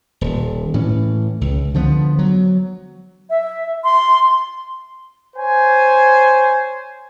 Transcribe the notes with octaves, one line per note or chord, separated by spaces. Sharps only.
D#1
A2 E3 C#4
C#2
D3 F3 G3 B3
F#3
E5
C6
C5 C#5 G#5